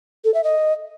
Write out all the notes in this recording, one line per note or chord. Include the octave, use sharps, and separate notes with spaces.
A4
E5
D#5